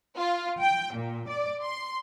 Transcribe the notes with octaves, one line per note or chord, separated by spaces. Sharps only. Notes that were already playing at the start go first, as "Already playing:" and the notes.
F4
G5
A#2
D5
C6